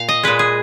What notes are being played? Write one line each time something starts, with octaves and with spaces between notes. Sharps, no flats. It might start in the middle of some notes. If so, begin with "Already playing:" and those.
Already playing: A#2 F5
D#5
A#2 G#3 B4
G#4